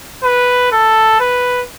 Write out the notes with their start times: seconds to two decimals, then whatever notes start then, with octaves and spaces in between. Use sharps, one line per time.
0.24 B4
0.72 A4
1.20 B4